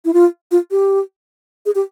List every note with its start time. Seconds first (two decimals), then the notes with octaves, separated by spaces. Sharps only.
0.05 E4
0.13 F4
0.51 F4
0.71 G4
1.66 G#4
1.75 G4